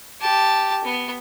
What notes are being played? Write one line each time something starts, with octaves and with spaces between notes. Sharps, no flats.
G4 A5
B3